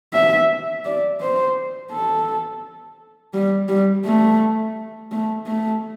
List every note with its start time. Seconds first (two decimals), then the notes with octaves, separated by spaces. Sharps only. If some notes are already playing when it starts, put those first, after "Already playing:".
0.14 E5
0.85 D5
1.21 C5
1.91 A4
3.34 G3
3.69 G3
4.05 A3
5.12 A3
5.47 A3